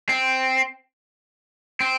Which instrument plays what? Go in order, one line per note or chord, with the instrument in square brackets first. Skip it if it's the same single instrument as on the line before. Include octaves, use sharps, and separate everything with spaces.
[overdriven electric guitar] C4
C4